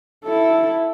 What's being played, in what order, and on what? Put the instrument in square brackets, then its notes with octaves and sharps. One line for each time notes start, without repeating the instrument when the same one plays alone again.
[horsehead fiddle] E4 A4